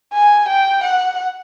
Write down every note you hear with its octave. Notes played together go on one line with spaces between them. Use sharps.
G#5
G5
F#5